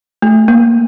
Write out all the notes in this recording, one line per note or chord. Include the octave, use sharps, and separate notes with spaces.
A3
A#3